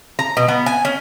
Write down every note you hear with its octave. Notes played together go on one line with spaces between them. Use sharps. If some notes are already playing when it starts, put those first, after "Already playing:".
A#5
B2
B3
G#5
C#4